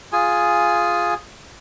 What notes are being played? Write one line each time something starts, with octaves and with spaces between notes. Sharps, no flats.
F4 G#4 G#5